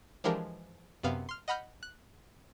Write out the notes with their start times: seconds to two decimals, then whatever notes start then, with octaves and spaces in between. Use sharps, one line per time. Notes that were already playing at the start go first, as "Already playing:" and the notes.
0.24 E3 F3 G#3 D4 G4 A#4
1.03 F#2 C3 B3 F5
1.29 C6 F6
1.48 D#5 F#5 B5 F6 G6
1.83 F#6